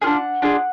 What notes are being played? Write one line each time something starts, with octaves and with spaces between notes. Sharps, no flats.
D4 F4 G#4 F#5
D4 F4 G#4